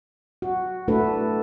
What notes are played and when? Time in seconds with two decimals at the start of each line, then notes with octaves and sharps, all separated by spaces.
0.42 F#4
0.88 A3 D4 E4 F#4 A4 B4